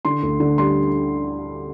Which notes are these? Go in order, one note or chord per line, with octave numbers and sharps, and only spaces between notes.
D3 C6
D2
D3
G3 C6